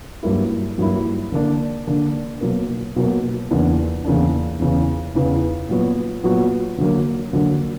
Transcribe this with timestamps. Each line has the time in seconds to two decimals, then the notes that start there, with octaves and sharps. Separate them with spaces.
0.23 G2 F#3 A#3 E4
0.78 G2 F#3 A#3 E4
1.32 D3 A#3 D4
1.87 D3 A#3 D4
2.41 B2 F#3 A#3
2.96 B2 F#3 A#3
3.51 E2 C#3 E3 A#3 D4
4.05 E2 C#3 E3 A#3 D4
4.59 E2 C#3 E3 B3
5.15 E2 C#3 E3 B3
5.69 A#2 F#3 B3 F#4
6.23 A#2 F#3 B3 F#4
6.78 D3 F#3 A#3
7.33 D3 F#3 A#3